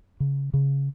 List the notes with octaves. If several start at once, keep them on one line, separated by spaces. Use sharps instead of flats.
C#3
C#3